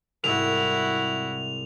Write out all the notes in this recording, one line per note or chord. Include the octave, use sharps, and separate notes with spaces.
C2 G#2 E4 F#4 F7